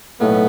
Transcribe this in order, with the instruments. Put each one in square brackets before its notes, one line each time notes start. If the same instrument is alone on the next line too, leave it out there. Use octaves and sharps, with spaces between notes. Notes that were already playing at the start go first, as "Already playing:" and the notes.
[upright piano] B1 A2 A3 [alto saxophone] B3